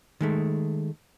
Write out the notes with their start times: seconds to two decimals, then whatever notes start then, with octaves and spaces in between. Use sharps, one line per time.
0.21 D#3 G#3 A3